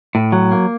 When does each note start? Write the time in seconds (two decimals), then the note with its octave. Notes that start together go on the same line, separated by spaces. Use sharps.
0.15 A2
0.32 F#3
0.51 A#3